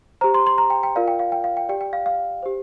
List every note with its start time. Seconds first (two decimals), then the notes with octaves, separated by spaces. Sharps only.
0.21 G4 C5 A#5
0.34 C6
0.47 C6
0.58 A#5
0.70 G5
0.83 G5
0.95 F4 A#4 D5 F5
1.08 G5
1.19 F5
1.32 G5
1.44 F5
1.57 G5
1.69 G4 D5 G5
1.81 G5
1.93 F5
2.06 F5
2.43 G4 C5